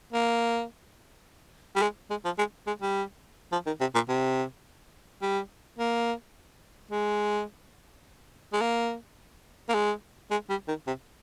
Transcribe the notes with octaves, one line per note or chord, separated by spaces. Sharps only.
A#3
G3
G#3
G#3
F3
G#3
G#3
G3
F3
D#3
C3
A#2
C3
G3
A#3
G#3
G#3
A#3
A#3
G#3
G#3
G3
D#3
C3